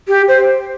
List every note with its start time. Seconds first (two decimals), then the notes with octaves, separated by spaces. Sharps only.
0.08 G4
0.28 C5